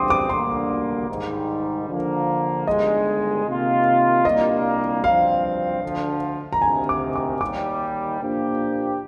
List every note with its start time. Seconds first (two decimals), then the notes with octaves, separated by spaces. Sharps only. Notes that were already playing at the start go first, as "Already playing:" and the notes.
Already playing: G1 G2 D3 G3 C4 C6 D6 D#6
0.10 D6
0.29 D2 D3 G3 A#3 C6
1.09 G#2 D#3 G3
1.88 D3 F3 A#3
2.67 G1 G2 D#3 G#3 D#5
3.46 C3 D#3 A#3 F4
4.25 C2 A#2 G3 A#3 D4 D#5
5.04 G2 F3 C4 F5
5.83 D2 D3 F3
6.53 A#5
6.62 D2 C3 D#3 G#5
6.89 D6
7.16 D6
7.41 D#2 D#3 G3 D6
8.20 A#2 F3 A#3 D4 G4